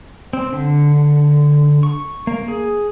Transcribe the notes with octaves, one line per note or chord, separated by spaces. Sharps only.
C4
D3
C#6
A#3
G#4